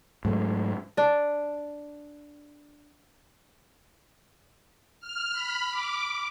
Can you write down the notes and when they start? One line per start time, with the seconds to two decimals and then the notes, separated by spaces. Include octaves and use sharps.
0.25 G#2 F#3 A3
0.97 D4 D5
5.00 F6
5.33 B5
5.70 D6